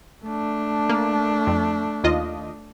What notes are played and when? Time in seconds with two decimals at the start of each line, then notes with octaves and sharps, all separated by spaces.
0.24 A3 D4
0.89 A#3
1.47 F2
2.04 D#2 F4 D#5